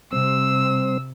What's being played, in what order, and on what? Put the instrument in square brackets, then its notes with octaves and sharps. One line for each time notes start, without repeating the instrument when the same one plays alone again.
[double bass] C3 [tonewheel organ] G3 C4 C5 [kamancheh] E6